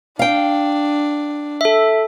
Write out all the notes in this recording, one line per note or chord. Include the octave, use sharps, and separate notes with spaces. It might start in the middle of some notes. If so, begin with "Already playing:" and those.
D4 F5 G5
A4 E5